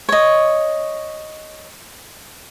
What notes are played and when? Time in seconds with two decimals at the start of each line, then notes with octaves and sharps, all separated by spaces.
0.09 C#5 D#5